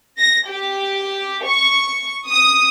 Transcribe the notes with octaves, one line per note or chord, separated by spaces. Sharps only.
A#6
G4
C#6
D#6